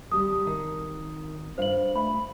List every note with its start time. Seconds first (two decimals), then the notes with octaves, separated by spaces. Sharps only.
0.12 G#1 G3 G4 A5 D#6
0.46 D#3
1.58 G2 F4 C5 F5 F#7
1.96 A3 B5